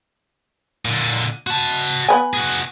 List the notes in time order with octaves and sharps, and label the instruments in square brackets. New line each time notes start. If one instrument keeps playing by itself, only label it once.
[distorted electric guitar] A#2 D3
F#4 A5
[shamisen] B3 B4 G#5
[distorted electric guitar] F#4 G#4